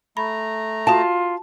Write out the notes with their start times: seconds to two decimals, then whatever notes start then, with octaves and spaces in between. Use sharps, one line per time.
0.17 A3 A#5 B5
0.87 F4 F#4 F5 A5